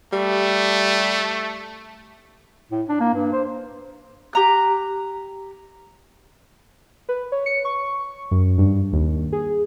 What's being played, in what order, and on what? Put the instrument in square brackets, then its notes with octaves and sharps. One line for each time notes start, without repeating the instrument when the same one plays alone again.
[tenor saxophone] G3 [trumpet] A3
[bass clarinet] A2
D4
A#3
G2
C5
[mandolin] G4 A#5 F#6
[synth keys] B4
C#5
C#7
C#6
F#2
G2
D#2
G#4